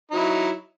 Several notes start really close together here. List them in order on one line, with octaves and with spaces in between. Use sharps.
D#4 F#3 E4